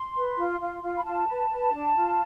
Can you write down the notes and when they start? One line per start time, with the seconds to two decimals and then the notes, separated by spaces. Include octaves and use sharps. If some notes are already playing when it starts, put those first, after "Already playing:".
Already playing: C6
0.14 B4
0.37 F4
0.60 F4
0.82 F4
0.97 B5
1.04 F4 A5
1.27 B4
1.50 B4
1.73 D4
1.95 F4